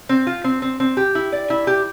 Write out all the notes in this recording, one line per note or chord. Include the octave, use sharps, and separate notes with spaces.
C4
F4
C4
C4
C4
G4
E4
D5
E4
G4